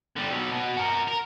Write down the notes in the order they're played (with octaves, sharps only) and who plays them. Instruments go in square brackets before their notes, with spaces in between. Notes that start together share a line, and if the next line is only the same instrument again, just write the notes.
[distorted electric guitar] D3 G3
B2 F#3
B2
F#4 A#4
A#4